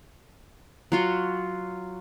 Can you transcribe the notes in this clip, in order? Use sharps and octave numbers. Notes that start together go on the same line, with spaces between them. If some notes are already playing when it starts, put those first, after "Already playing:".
F#3 F4 F#4